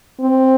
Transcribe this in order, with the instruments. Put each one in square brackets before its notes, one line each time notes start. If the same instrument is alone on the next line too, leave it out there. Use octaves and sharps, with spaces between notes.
[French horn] C4